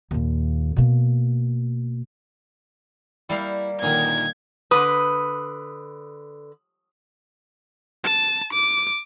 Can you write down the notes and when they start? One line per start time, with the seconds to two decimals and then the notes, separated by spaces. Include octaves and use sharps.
0.11 D#2 A#2
0.76 B2 A#3
3.29 G3 A#3 E4 F5
3.82 A#2 D3 D#3 G#6
4.71 D3 B4 D#6
8.04 A5
8.53 D6